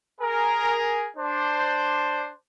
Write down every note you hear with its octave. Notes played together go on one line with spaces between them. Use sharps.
G#4 A#4
D4 C5